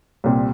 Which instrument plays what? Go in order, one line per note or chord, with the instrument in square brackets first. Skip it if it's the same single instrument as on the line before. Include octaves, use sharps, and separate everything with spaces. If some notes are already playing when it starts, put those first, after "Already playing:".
[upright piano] C2 A#2 G3 C4